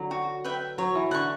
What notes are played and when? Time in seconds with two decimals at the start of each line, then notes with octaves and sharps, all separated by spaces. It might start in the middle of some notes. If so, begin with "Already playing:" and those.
Already playing: D3 F#3
0.11 F#4
0.44 B4 E5 G5
0.78 F#3 C#5
0.95 E3
1.11 D3 F#5 C#6